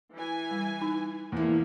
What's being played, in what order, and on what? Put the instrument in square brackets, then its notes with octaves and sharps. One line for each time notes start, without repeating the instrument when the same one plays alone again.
[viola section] E3 G#5
[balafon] G3
D#4
[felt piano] E2 E4 [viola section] F3 A#3